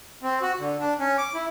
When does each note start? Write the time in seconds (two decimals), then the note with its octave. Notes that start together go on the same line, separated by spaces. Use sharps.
0.23 C4
0.42 F#4
0.59 D3
0.80 D4
0.99 C#4
1.18 D6
1.34 E4